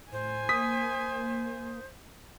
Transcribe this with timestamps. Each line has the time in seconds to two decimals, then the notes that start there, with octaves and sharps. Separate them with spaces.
0.12 A2 C5 G#5
0.49 A#3 D#6 B6